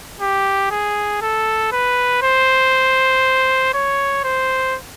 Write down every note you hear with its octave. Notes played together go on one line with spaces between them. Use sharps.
G4
G#4
A4
B4
C5
C#5
C5